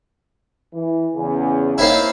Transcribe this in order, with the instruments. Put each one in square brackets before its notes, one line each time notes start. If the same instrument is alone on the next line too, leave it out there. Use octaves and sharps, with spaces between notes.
[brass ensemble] E3
E2 C#3
[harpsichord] A#3 C4 E4 [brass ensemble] D#4 C#5